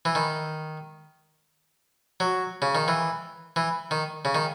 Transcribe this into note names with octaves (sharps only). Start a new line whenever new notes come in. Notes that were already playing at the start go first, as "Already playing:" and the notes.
E3
D#3
F#3
C#3
D#3
E3
E3
D#3
C#3
D#3